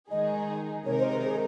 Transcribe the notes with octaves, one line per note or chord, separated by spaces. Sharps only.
D#3 G#3 D#4 G#4 D#5
C3 D#3 G#3 D#4 A#4 C#5
C5
C5
G#4